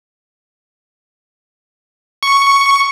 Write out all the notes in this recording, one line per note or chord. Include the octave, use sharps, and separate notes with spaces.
C#6